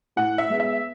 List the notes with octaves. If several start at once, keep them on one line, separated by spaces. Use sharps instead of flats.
A2 F#5
E5
G#3 B3
E5